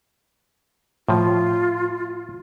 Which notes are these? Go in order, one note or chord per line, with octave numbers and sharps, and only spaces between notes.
A2 F3 F4